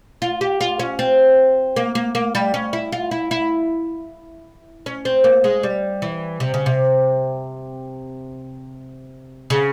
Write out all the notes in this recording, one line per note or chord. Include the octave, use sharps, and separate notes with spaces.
F4
G4
F4
C#4
C4
A#3
A#3
A#3
G3
C#4
E4
F4
E4
E4
C#4
C4
A#3
G#3
G3
E3
C3
C#3
C3
C#3